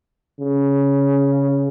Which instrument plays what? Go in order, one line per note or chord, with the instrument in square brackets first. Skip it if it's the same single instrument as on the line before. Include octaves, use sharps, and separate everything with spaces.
[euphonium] C#3